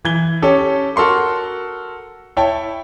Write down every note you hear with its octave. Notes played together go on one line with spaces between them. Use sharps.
E3 G#6 G7
C#4 G4 A4
F#4 A4 A#4 C6 C#6
E4 C#5 E5 G5 A5